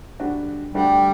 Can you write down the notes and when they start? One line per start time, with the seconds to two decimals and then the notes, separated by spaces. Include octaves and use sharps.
0.19 D3 G3 D4 F#4
0.74 D3 G3 A3 D4 F#4